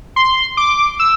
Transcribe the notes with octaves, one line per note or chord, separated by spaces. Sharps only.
C6
D6
E6